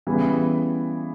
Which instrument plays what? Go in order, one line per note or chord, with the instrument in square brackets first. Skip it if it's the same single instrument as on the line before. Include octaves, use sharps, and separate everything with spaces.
[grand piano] C#3 E3 G3 B3 E4